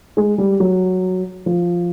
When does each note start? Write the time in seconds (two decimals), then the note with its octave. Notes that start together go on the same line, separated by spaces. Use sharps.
0.17 G#3
0.38 G3
0.60 F#3
1.46 F3